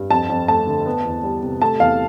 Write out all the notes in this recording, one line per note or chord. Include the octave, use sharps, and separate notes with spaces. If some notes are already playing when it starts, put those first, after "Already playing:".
Already playing: G2
F2 A5
F2
A3 A5
D3
B3
E2
G3
C3
A3 A5
E2 F5